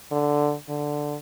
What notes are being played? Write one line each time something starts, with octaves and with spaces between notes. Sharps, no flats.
D3
D3